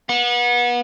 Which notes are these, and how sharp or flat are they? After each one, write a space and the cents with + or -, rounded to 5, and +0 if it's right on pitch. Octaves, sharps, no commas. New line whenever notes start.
B3 -30 F#5 -30